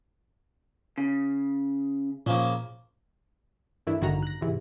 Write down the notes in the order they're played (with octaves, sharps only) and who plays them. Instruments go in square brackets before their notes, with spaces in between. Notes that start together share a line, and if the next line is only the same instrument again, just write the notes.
[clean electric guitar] C#3
[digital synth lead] A#2 [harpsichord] C#3 F3 A#3
[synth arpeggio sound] G2 D#3 E3 A3 D4 E4
A1 G2 D3 D#3 F#4 A#5
F#6 A#6
E2 G#2 C3 E3